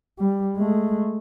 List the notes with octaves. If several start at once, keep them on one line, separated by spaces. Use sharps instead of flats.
G3
G#3 A3